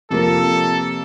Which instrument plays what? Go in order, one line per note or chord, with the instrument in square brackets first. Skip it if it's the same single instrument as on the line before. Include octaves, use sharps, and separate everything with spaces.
[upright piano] F2 C3 F3 A#3 [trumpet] A4